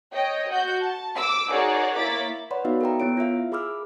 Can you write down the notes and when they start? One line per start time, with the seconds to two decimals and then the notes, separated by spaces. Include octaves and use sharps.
0.12 C#5 D#5 G5
0.49 F#4 G6
0.80 A5
1.14 D6 E6
1.48 D#4 F#4 G#4 A#4 C#5 D5
1.97 A#3 E4 C#5 D6 A6 B6
2.51 B4 C#5 D5 F#5 B5 C6
2.65 B3 D#4 F#4 D5 E5 F5
2.81 A4 A#4 G5 A#5
3.00 B3 E4 C#5 D7
3.17 F4 A#4 E5 F5
3.52 G#4 A#4 B5 D6 E6 F6